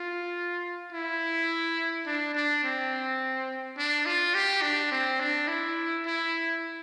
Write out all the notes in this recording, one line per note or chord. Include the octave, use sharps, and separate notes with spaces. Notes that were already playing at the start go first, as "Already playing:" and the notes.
Already playing: F4
E4
D4
D4
C4
D4
F4
G4
D4
C4
D4
E4
E4